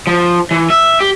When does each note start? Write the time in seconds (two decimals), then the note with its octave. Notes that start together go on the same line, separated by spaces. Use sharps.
0.07 F3
0.51 E3
0.70 E5
1.00 G4